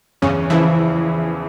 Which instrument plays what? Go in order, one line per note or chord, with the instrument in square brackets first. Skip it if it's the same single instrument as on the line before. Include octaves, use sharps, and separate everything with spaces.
[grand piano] E2 [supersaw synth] C#3 C#4
[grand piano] C#3 F3 [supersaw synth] E3 E4